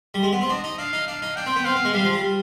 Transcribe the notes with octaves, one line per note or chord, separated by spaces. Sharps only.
G3
G#3
B3
C4
D4 D#5
D#4
D4 F5
D#4
D4 F5
D#4
D4 G5
C4
B3
C4 F5
B3
G#3
G3 F5
F3
G3